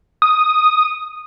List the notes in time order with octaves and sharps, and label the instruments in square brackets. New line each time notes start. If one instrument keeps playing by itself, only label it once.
[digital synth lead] D#6